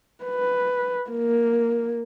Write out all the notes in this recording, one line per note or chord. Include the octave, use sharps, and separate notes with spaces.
B4
A#3